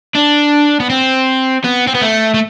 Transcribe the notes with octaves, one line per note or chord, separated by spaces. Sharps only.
D4
B3
C4
B3
C4
B3
A3
A3